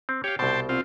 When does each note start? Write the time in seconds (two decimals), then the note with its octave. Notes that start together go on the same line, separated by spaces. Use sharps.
0.09 C4
0.24 G4 C#5 F5
0.39 C2 B2 C5 G5 A5
0.69 C4 F4